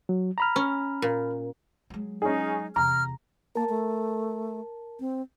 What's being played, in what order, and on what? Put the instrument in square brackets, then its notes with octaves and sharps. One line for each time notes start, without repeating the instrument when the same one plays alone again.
[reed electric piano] F#3
A#5 B5 F6
[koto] C#4
A#2
[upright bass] F#3 G#3
[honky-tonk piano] C#4 G#4 [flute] D#4
[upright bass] E2 C3 [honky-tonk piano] A#5 [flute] F6
[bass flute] A#3 [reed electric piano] A#4 A5
[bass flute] A3
C4